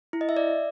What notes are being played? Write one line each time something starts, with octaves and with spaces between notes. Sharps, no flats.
E4
D#5
E5
D5